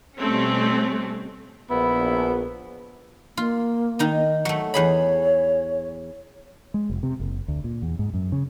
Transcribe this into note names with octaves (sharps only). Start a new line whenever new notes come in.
B2 G3 A3 C4 C#4
A#1 B3 E4
A#3 F4
D#3 D#4 D#5
F#3 A3
E2 G#4 C#5 B5
G#3
F1
C3
F#1
D2
A#2
E2
G#2
F#2
C#3